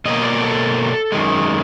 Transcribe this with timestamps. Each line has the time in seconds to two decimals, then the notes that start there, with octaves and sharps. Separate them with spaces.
0.05 B2 F#3 A#3 D#5
0.23 D5
0.41 A4
1.12 F#2 D#3 G#3